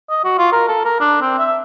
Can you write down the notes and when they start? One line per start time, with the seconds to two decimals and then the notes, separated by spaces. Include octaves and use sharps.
0.10 D#5
0.24 F#4
0.38 F4
0.52 A#4
0.68 A4
0.85 A#4
1.00 D4
1.21 C4
1.39 E5